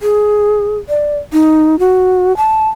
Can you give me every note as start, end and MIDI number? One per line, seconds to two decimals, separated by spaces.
0.01 0.77 68
0.89 1.18 74
1.33 1.79 63
1.79 2.36 66
2.37 2.68 81